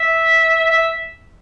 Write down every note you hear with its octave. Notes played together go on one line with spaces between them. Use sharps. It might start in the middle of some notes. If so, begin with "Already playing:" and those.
Already playing: E5
E5